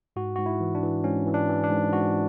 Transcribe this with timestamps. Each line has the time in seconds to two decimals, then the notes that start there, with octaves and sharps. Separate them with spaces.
0.16 G#2 F#4
0.36 G#2 F#4
0.46 E4
0.61 E3
0.75 D4
0.83 E3
1.04 G#2 C#4
1.27 E3
1.34 D4
1.49 E3
1.64 D4
1.70 G#2
1.93 G#2 F#4